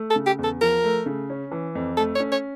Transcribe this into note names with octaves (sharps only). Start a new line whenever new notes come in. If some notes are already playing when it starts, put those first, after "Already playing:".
Already playing: A3
A4
C#3
G4
E2
A4
F3 A#4
A3
C#3
C#4
E3
F2
A3 A4
C#5
C#4
C#5